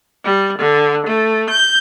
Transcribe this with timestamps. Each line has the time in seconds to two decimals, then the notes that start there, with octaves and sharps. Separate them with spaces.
0.24 G3
0.59 D3
1.06 A3
1.50 G6